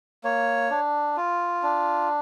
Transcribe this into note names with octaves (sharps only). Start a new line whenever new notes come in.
A#3 C#5
D4
F4
D4